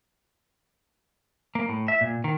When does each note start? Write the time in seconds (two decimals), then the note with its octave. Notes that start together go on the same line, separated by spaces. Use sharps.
1.55 A#3
1.69 A2
1.88 E5
2.01 A#2
2.24 D#3